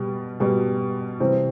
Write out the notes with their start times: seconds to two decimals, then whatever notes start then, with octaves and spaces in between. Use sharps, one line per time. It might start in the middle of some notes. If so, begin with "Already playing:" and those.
Already playing: B2 G3
0.40 B2 G3
1.20 C3 E3 G3 C4